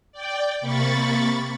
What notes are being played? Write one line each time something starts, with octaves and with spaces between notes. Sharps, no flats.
D5 G5
C3 A#3 B5 C#6 A6